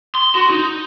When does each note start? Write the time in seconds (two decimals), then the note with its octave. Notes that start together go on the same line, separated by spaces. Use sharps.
0.15 C6
0.35 F#4
0.50 D#4